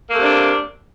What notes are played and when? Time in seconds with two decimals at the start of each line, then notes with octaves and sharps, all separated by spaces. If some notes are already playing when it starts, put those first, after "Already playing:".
0.07 A#3
0.12 A3
0.17 C3
0.21 D4